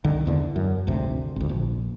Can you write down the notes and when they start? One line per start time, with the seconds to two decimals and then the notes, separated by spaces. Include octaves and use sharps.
0.04 C2 D3 D#3
0.26 E1 E2 D3
0.56 F#2
0.87 G#1 D2 C3
1.36 G#1 D2
1.49 A#1